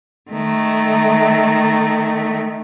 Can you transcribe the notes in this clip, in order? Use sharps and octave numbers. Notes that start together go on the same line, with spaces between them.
D#3 A3